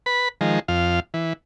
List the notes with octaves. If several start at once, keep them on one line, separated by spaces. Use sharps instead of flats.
B4 B5
D#3 F3 G#3
F2 F5
E3